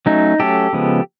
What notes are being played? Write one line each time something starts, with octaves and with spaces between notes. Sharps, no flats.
F#3 A3 C#4 D#4
F#3 A3 C#4 G4 A4
C#3 F3 G#3 B3